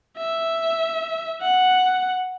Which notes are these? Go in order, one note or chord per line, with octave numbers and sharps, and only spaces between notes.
E5
F#5